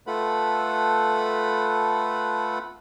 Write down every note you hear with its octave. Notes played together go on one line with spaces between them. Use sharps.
A3 F4 A4 B4 F#5 B5